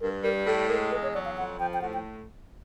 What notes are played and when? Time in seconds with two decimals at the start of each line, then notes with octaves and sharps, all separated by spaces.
0.01 G2 A#4
0.23 G3 A#4
0.46 A2 A4
0.68 G#3 A#4
0.91 E2 B4
1.03 C#5
1.14 F#3 D5
1.25 F5
1.36 F2 F#5
1.59 F3 G5
1.74 G5
1.82 A2 F#5
1.93 G5